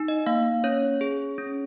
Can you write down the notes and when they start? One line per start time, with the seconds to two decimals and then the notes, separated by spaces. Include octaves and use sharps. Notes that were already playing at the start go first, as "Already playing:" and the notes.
Already playing: D#4
0.08 D#5
0.26 A#3 F5
0.64 C#4 C#5
1.01 G#4
1.38 C#4